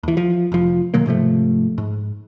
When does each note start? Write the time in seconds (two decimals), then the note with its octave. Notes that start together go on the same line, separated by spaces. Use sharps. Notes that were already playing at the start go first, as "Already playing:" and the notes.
0.03 D#2 E3
0.17 F3
0.52 F1 F3
0.94 B2 D#3 F#3 A#3
1.06 G#2 C3 F3 A3
1.78 G#2